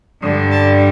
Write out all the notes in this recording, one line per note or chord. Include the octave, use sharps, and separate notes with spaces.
G2 D3 G3
A5